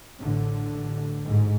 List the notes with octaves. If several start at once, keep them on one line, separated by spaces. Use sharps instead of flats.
A1 A2 D3
A1 A2
A1 G#2